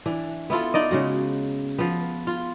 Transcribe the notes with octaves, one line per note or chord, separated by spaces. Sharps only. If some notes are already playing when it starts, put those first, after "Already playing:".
E3 D4
B3 E4 F4 A4
D#4 D5 D#5
C#3 G#3 F#4
F3 B3
F4